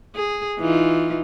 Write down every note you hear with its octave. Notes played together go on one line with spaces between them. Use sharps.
G#4
E3 D#4 F4